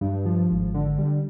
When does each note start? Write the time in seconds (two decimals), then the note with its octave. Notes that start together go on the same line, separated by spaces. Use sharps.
0.01 G2
0.25 F3
0.50 G#1
0.74 D3
0.98 G3